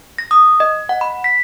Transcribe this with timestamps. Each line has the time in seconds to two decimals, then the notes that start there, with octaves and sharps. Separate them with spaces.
0.18 A#6
0.31 D#6
0.60 D#5
0.89 F#5
1.01 B5
1.24 B6